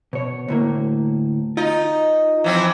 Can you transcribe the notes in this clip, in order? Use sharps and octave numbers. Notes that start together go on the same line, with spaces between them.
B2 C#5
D2 A2 A#3
D#4 F4
E3 F3 C4